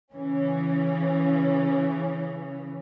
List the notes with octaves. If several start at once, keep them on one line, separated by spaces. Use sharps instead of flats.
C#3 E3 C#4